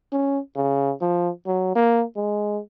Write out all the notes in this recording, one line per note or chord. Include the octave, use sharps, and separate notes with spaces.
C#4
C#3
F3
F#3
A#3
G#3